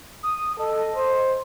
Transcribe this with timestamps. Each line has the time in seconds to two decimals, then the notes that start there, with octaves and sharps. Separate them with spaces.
0.23 D#6
0.59 A4 D#5
0.95 C5